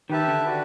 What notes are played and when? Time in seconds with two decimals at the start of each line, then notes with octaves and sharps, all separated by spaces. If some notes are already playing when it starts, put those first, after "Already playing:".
0.10 D#3 G4 B4 E5 A5
0.28 D3
0.46 D4 F#4 B4